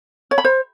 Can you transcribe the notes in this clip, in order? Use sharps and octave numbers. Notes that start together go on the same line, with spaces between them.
C#5
B5
C5